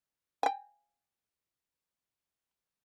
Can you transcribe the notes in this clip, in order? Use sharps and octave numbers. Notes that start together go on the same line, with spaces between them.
G5 G#5